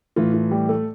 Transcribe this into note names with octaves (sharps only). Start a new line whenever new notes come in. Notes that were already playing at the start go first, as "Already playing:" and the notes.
A2 E3 A3 F4
F4
G3 G4
A3 A4